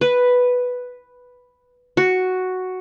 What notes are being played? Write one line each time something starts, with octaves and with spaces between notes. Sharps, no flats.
B4
F#4